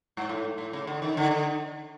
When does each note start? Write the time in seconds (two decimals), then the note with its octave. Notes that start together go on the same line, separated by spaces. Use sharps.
0.17 G#2
0.29 A2
0.58 A2
0.73 C#3
0.87 D3
1.02 D#3
1.17 D3
1.31 D3